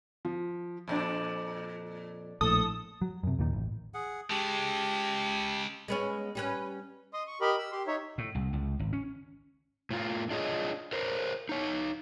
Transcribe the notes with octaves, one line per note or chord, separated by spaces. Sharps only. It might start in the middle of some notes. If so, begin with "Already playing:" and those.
F3
F2 A#2 D4
A#1 A2 A4 D#6
F#3
F#2 C3
D#2 A#2 D#3
A1
G#4 F#5
C#3 G#3 G4 A5
G#3 B3 C#4
G3 C#4 B4
D#5 C6 D#6
C#6
G4 A#4 D#5 B5
E6
G4 C6
D#4 C#5 E5
A2
C2
C#2
G#1
C#4
A2 F4
D4 F4 G#4 C#5 D#5
A#4 C5 C#5
D#4 C#5